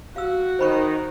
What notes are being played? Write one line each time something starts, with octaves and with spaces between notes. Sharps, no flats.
F#4 F5 E6
D#3 D#4 C5 B5 C#6